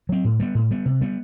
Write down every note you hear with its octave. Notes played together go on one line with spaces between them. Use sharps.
F#3 C4
A2
G3 B3
A2
G3 B3
C3
G3 B3